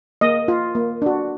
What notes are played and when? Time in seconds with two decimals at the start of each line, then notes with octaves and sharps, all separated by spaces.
0.21 A#3 D#5
0.48 F4
0.75 A#3
1.02 D4 F#4